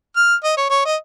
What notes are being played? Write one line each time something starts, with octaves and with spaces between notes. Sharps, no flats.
F6
D#5
C#5
C#5
D#5